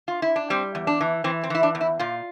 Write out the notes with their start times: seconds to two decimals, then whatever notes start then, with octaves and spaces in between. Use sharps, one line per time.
0.08 F4
0.22 E4
0.36 D4
0.50 G3 C4
0.75 E2
0.87 D4
1.01 E3
1.24 E3 C4
1.43 C4
1.50 E3 E4
1.63 D4
1.75 E2
1.81 E4
1.99 A#2 F4